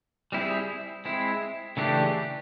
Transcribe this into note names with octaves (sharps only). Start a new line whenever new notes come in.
G3 C4 E4 G#4
G#3 C4 E4
C#3 E3 A3 D4 G4